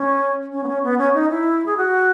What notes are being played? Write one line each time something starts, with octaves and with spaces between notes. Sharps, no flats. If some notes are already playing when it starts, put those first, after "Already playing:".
Already playing: C#4
C#4
B3
C#4
B3
C#4
D#4
E4
G#4
F#4